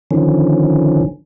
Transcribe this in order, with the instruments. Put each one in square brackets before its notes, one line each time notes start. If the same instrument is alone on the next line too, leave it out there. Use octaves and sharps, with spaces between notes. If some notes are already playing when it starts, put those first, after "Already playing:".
[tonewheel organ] D3 D#3 F3 C#4